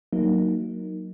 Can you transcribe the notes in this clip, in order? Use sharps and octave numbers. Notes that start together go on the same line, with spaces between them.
F#3 A#3 D#4